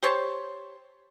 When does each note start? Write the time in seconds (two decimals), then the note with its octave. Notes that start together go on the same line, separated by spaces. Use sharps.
0.03 G4 C5 C#5 A5